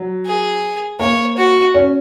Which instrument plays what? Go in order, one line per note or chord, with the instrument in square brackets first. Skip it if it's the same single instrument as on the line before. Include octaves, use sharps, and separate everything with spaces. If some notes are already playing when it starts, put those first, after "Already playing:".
Already playing: [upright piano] F#3
[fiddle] G#4
[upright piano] A#3 [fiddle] C#5
[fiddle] F#4
[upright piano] C#4